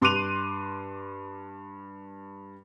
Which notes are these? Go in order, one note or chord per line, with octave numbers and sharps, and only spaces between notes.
G2 C6 D6 F#6 D#7 F7